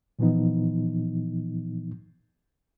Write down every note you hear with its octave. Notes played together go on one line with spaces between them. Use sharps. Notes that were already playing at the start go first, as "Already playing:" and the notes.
A#2 E3 F3 B3 D#4